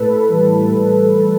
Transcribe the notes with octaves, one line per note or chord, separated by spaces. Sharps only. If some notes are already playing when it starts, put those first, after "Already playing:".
Already playing: A2 A4 B4
E3 G3
A2
E3 G3